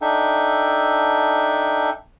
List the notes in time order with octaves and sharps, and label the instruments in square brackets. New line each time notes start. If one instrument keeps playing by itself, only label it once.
[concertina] D4 D#4 A4 E5 G5